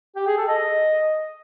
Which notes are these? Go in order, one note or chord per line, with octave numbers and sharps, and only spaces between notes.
G4
G#4
A4
D#5